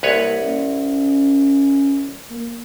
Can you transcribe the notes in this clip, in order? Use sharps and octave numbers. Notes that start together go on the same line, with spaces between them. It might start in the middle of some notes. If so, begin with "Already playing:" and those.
C2 A#3 B4 C#5
C#4
A#3